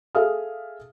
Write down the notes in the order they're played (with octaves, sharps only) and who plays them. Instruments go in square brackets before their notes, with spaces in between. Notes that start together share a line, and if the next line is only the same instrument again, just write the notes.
[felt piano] G#4 A4 E5 F5 D#6 F6